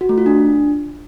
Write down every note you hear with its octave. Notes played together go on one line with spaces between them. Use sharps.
F#4
A3
F4
D4